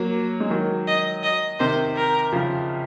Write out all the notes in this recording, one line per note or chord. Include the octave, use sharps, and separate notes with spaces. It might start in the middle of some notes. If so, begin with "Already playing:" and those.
Already playing: F#3 A#3
G#3
D#3 F#3
D#5
D#5
C3 D#3 C5
A#4
C#3 F3